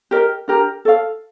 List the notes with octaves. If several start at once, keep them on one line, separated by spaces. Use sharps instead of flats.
G4 A#4 D#5
D4 G4 A#4
A4 C#5 F5